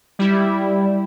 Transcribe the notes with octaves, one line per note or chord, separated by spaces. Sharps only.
G3 E4